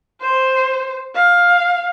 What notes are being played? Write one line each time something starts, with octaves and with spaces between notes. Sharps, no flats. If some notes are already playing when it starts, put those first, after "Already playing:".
C5
F5